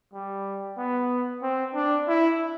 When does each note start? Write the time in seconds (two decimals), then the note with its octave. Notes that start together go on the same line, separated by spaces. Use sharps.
0.14 G3
0.78 B3
1.42 C4
1.74 D4
2.08 E4